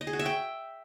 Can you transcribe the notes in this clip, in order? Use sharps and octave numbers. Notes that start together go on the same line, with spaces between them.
D#5
G#4
F#4
E5
G5